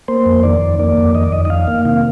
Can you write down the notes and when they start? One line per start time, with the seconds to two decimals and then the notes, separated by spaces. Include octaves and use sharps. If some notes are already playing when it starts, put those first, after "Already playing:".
0.08 A#3 C5
0.26 F2
0.43 D#3 D5
0.61 F2
0.79 A#3 D5
0.97 F2
1.15 D#3 D#5
1.24 D5
1.32 F2 D#5
1.45 D#5
1.50 D#3 F5
1.67 A#3
1.85 C3 F5